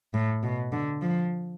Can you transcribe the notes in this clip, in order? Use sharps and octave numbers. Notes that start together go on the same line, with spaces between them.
A2
B2
D3
F3